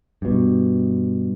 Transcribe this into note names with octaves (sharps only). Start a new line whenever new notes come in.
G2 B2